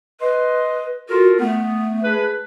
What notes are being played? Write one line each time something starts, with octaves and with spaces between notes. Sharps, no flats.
B4 D#5 C6
F4 F#4 A4 A#4
A3 B3
D4 G#4 B4